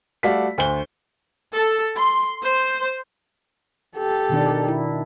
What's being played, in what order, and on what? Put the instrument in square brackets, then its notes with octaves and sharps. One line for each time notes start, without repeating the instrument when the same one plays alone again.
[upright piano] G3 A3 F#4 D5 F5 B6
D2 C5 G7
[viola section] A4
C6
C5
[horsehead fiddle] G4 A4
[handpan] B2 D#3 D4
E4